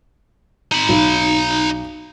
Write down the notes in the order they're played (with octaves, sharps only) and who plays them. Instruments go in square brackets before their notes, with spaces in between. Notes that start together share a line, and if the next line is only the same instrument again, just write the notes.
[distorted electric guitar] D#4 B5
[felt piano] B1